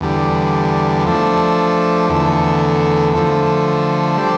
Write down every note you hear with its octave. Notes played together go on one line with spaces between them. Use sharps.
E2 D3 G3
F3 A3 D4
E2 D3 A3
D3 F3 A3
G3 D4 A4 C5